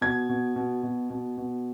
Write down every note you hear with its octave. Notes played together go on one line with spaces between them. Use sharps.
B2 G#6
B2
B2
B2
B2
B2